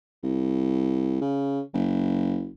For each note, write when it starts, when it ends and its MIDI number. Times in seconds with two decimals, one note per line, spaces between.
0.23 1.20 36
1.21 1.61 49
1.74 2.49 30